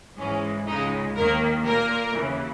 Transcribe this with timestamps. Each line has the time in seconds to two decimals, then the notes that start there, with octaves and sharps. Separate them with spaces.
0.18 G#2 E3 G#3 C#4
0.67 C#2 C#3 G#3 D#4
1.15 D#2 D#3 A#3 A#4
1.65 A#2 A#3 A#4
2.14 D#2 C#3 E3